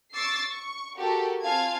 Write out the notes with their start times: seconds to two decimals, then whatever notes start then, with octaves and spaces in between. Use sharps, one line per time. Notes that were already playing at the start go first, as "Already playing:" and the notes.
0.13 C#6 D6 E6 A6 C7
0.49 C#6
0.98 F#4 G4 A4 A#4
1.41 C4 F4 F5 G#5 A5 G#6